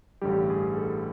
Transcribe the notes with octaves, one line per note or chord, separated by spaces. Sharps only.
A1 G2 D3 G3 G4
G#4
A4